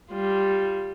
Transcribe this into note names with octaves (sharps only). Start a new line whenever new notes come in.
G3 F4